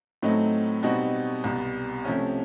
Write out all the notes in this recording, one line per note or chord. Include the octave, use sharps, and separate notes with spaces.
A2 F#3 A3 C4 D#4
B2 G3 C4 D#4 F#4
C2 B2 G3
C3 F3 A3 C#4